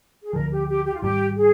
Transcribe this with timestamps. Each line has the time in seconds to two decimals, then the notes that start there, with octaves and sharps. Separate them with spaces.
0.23 G#4
0.33 D2 D3 F3 A#4
0.51 G4
0.68 G4
0.85 G4
0.94 F4
1.02 G#1 G2 D#3 G3 G4
1.36 G#4